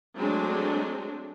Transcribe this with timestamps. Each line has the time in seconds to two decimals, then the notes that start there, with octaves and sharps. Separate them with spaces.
0.18 F#3 G#3 A3 C4 D4